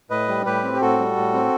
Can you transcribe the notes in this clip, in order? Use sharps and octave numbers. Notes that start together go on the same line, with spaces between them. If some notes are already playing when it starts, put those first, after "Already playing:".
A2 B4 D#5
G3
A2 G4 B4
C4
G4
A2 F#4 A4
G3
A2
C4